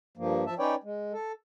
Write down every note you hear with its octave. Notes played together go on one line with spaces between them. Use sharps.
G2 F3 A#3
F3 E5 A5
C#4 D#4 B4 C#5 D5 G5
G#3
A4